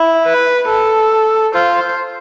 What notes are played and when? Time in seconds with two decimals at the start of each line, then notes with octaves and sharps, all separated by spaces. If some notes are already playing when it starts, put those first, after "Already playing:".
Already playing: E4
0.25 B4
0.69 A4
1.54 F4 C5